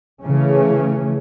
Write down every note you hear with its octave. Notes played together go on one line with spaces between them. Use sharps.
C#3 E3 A3 C#4